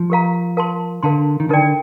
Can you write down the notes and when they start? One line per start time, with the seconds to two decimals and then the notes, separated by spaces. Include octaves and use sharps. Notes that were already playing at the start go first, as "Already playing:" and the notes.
Already playing: F3
0.10 G4 A#4 F5 A#5
0.57 A#4 F5 A5 C6
1.03 D3 A#4 F5 A5 C6
1.40 D#3
1.49 D3 D#4 A#4 D5 G5